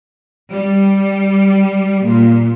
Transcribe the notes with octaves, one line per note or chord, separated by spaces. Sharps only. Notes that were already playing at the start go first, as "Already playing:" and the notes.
G3
A#2